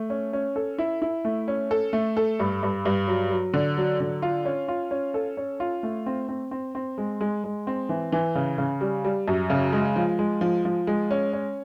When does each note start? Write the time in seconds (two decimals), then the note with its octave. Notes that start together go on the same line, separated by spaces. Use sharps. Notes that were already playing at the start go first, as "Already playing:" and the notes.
Already playing: A3
0.10 C#4
0.33 C#4
0.56 A4
0.78 E4
1.02 E4
1.25 A3
1.48 C#4
1.71 A4
1.93 A3
2.17 A4
2.40 G2
2.63 G2
2.85 G2
3.07 F#3
3.31 F#3
3.54 D3
3.77 F#3
4.00 D3
4.22 F4
4.45 C#4
4.68 F4
4.91 C#4
5.14 A4
5.37 C#4
5.60 F4
5.83 A3
6.06 C4
6.29 C4
6.51 C4
6.75 C4
6.98 G#3
7.21 G#3
7.44 G#3
7.67 C4
7.89 E3
8.12 E3
8.35 C#3
8.58 C#3
8.81 G3
9.05 G3
9.28 F#2
9.50 C#3
9.72 G#3
9.96 F3
10.19 G#3
10.41 F3
10.65 F3
10.87 G#3
11.11 C#4
11.33 C#4